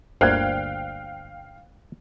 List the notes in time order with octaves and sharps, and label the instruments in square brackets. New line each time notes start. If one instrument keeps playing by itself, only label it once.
[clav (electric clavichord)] G1 D2 A#3 [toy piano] C5 D5 [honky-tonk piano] F5 G5 F#6